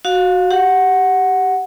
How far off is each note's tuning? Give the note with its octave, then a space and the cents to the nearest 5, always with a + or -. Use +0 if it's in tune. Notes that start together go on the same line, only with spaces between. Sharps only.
F#4 +0 F5 +25
G4 +0 F#5 +0